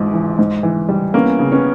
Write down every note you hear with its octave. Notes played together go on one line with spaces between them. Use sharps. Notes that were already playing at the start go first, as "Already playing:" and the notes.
Already playing: A1 G#2 F3
E3
G#2
E3
G3
A#3 B3 C#4
C#3
B3 C#4